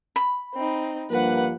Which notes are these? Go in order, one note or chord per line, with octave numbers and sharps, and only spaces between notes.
B5
C4 D#4
G2 F3 A#3 B4 F#5